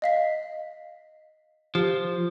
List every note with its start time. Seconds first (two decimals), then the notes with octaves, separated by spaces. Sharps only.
0.02 D#5 F5 B6
1.75 F3 G4